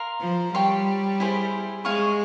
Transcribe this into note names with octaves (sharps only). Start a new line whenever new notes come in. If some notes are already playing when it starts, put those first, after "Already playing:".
Already playing: A#4 F5 C6
F3
G3 C#5 G5 C6
E4 G#4 C5
G#3 C#5 F5 G#5 C#6